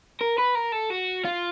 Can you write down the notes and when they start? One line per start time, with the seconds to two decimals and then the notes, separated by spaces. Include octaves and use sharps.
0.21 A#4
0.38 B4
0.55 A#4
0.72 A4
0.90 F#4
1.25 F4